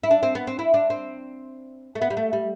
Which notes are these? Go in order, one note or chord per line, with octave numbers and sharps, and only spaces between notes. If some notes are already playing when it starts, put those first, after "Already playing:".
E4
D4
C4
B3
C4
E4
D4
C4
A3
B3
G3
A3
G3